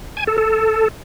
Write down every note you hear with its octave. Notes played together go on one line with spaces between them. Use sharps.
G#5
A4
A4